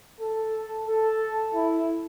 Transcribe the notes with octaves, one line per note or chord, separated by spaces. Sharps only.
A4
A4
E4